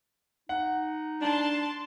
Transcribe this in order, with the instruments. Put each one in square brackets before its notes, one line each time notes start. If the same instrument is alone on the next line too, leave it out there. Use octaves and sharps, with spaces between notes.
[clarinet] D#4 [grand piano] F#5
[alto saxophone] D4 [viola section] A5 C6